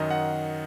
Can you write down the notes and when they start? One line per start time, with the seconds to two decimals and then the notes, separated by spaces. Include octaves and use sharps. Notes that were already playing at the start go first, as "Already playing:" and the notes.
Already playing: F#2 D#3 D#5
0.11 F#5